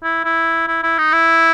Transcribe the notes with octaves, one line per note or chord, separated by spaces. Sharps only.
E4
E4
E4
E4
D#4
E4